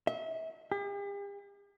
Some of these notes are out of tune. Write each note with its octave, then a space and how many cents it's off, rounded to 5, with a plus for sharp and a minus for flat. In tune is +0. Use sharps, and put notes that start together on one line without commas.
E5 -35
G4 +45